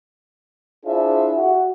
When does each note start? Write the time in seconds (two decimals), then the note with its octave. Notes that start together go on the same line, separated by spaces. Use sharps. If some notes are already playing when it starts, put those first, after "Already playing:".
0.86 D4 E4 F4 G#4 C5 E5
1.36 F#4